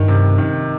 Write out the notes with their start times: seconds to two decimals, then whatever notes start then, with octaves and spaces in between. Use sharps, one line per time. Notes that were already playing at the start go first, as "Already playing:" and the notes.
Already playing: G2 D#3
0.08 C3
0.38 D#3